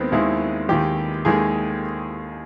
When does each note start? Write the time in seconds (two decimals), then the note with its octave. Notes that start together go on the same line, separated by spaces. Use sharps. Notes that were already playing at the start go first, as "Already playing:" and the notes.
Already playing: D#2 D#3 G#3 B3 C4
0.12 D#2 D#3 G#3 E4
0.69 D#2 D#3 G#3 G4
1.25 D#2 D#3 G#3 G#4